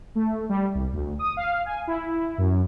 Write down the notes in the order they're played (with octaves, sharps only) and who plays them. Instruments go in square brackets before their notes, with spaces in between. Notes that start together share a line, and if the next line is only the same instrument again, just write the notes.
[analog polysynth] A3
G3
C2
D2
D#6
F5
G#5
E4
F#2